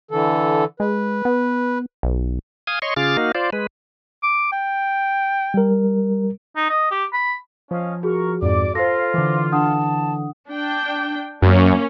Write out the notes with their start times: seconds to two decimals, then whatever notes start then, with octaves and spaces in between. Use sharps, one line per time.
0.11 D3 E3 A4
0.80 G#3 B4
1.25 B3
2.03 B1
2.67 F5 G#5 D#6
2.82 C#5 D#5 C6 C#6
2.96 C#3 F4 G#4 D6 F6 A6
3.17 A#3 D#4 F#4 F5
3.35 F4 C5 D5
3.53 G#3 B4
4.23 D6
4.52 G5
5.54 G3 A#4
6.56 D#4
6.69 D#5
6.91 G4
7.13 B5
7.71 F3 C#4 D#5 F5
8.03 F#4 G#4 A#4 C#6
8.42 F2 G#2 D5 D6
8.75 F4 A4 C5 F5 A#6
9.14 D3 E3 D6
9.52 D4 F#5 A5 D#6
10.49 D4 G5
11.42 F#2 A#3 C#4